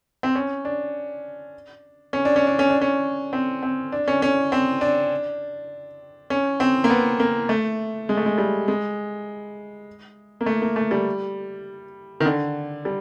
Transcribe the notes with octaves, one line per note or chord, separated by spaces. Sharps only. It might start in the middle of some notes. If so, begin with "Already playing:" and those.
C4
C#4
D4
C#4
D4
C#4
D4
C#4
D4
C#4
C4
C4
D4
C#4
C#4
C4
D4
C#4
C4
A#3
B3
A#3
A3
G#3
A3
G#3
G3
G#3
A#3
A3
A#3
A3
G3
D#3
D3
G3